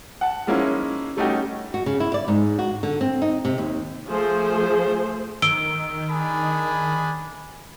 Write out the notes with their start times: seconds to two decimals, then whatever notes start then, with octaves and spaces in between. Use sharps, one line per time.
0.21 F#5 A5
0.47 F3 G#3 A#3 C#4 D#4 E4
1.17 G3 A3 C#4 D#4 F#4 G4
1.74 F#4
1.86 C#3
2.00 E4
2.14 D5
2.28 G#2
2.59 F#4
2.83 D3
3.01 C4
3.22 D#4
3.45 C3
3.58 D#2
4.09 F3 A3 G#4 C5
5.42 D#3 E6 D7 G7
6.10 D4 G#4 B5